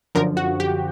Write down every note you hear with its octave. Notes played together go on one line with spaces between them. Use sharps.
F#2 D3 F3 A#4
F#4
G4